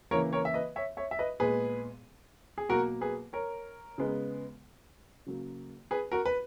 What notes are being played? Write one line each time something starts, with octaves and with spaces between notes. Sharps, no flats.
C#3 E3 A#3 A#4 C#5
A#4 C#5
E5
B4 D#5
C#5 E5
C#5 E5
E5
B4 D#5
A#2 G#3 B3 G#4 B4
G#4
B2 F#3 A#3 F#4 A#4
G#4 B4
A#4 C#5
C#3 G#3 B3
C#3 F#3 A#3
G#4 B4
F#4 A#4
B4